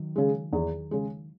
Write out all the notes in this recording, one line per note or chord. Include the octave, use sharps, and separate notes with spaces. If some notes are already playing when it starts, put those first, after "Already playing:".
Already playing: D#3 F#3
C#3 G#3
E2
C#3 G#3